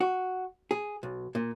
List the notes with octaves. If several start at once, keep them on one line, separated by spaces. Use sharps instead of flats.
F#4
G#4
B1
A#2